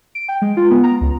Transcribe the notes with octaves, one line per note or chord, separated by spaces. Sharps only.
D7
G5
G#3
F4
B3
A#5
C#2